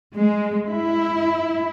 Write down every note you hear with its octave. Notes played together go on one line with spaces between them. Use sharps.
G#3
E4